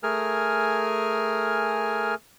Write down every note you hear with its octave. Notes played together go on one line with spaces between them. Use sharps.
A3 G#4 A#4 G#5 F6